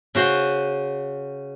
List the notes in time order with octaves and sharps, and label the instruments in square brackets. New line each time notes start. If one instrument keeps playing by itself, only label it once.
[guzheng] C#3 F#4 C5